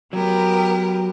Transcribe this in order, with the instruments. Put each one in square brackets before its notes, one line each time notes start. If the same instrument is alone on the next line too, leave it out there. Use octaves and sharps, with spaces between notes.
[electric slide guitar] F#3 [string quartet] B3 G4 A#4